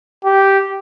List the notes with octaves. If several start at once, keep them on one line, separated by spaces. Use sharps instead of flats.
G4